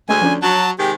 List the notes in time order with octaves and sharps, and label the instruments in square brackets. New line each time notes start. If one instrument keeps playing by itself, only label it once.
[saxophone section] D2 [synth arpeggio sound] G#3 A3 G#4 [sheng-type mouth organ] G#5
[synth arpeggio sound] F3 C#4 D4
[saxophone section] F#3 [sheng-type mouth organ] A5
[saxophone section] C3 D#3 G#3 [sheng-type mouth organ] G4